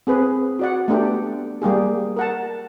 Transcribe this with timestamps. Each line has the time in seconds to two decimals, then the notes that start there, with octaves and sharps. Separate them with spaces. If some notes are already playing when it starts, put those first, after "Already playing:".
0.07 C4 G#4 B4
0.59 F#4 D5 F#5
0.88 A3 B3 D4 G4 A4
1.62 G3 A#3 G4 G#4
2.17 A#4 F#5 A5